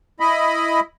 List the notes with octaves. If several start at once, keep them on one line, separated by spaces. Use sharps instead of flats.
E4 D#5 B5